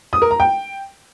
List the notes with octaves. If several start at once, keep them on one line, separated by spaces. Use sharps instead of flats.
D#6
A#4
A#5
G5